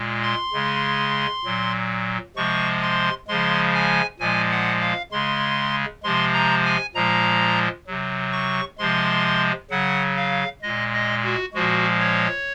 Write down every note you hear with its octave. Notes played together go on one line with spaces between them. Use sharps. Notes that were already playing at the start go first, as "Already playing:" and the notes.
Already playing: A#2 G#3
C6
C#3 G#3
A#2 F#3
C3 F3 G#3 C#6
C6
C#3 F3 G#3 C6
G#5
A#2 F3 G#3 G#5
F#5
F5
C#3 G#3 C6
C3 F3 G#3 C6
A#5
G#5
A#2 F3 G#3 A#5
C3 F#3
C#6
C3 F3 G#3 C6
C#3 F#3 F#5
F5
A#2 G#3 D#5
D#5
F#4
A#2 F3 G#3 F#4
C#5